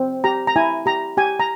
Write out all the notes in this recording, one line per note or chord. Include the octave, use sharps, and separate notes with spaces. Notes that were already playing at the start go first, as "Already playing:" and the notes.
Already playing: C4
G4 A#5
A#5
E4 G#5
G4 A#5
G4 G#5
A#5